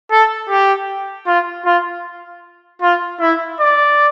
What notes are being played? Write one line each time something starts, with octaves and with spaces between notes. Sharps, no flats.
A4
G4
F4
F4
F4
E4
D5